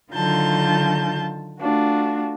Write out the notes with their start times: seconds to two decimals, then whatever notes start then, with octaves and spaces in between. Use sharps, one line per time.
0.12 D3 D#3 F#3 F4 A5 G6
1.59 A3 D4 F4 F#4